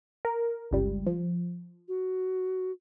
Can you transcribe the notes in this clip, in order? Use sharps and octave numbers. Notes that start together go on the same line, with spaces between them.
A#4
G1 C#2 G3
F3
F#4